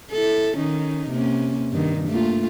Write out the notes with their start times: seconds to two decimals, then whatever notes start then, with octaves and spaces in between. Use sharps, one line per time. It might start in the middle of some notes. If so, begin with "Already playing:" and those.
0.12 E4 A4
0.56 D#3 C#4 D#4
1.10 C3 A#3 C#4
1.71 G2 D#3
2.08 A3 A#3 F4